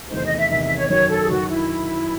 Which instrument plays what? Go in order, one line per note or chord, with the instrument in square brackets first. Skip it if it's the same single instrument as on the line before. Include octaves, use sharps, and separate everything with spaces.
[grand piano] E2 C3 D#3 A3 D#4 [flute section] C5
[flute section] D#5
E5
[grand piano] E2 C3 D#3 A3 D#4 [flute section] E5
[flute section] E5
C#5
[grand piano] F#2 D#3 F#3 [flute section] C#5
[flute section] A4
G#4
[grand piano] F#2 D#3 F#3 [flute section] F#4
[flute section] E4